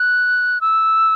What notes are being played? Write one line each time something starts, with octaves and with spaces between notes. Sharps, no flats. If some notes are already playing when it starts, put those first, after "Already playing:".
Already playing: F#6
E6